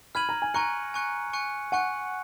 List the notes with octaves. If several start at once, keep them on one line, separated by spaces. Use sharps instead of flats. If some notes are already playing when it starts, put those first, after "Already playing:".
B5 F6 G#6 D#7 F#7
A#5
G#5
G#5 A#5 C#6 F#6 C#7
G#5 C#6 F#6 C#7
G#5 C#6 F#6 C#7
F#5 G#5 C#6 F#6 C#7